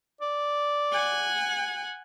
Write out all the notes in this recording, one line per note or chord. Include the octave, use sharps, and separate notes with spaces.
D5
F#5 G#5